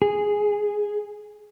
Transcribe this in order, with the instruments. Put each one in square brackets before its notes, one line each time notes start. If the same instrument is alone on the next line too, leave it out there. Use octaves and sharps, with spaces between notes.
[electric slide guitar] G#4